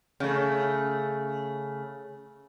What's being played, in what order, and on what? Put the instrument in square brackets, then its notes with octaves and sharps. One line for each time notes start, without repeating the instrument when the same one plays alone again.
[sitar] C#3 A3